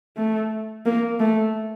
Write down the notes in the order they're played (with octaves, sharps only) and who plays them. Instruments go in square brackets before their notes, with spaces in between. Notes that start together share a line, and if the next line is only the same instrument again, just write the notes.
[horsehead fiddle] A3
A#3
A3